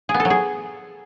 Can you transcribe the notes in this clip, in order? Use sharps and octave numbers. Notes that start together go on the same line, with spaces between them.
G#4
B3
A4
F#3
G#4